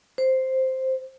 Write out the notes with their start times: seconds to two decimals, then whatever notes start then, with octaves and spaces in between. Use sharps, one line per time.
0.18 C5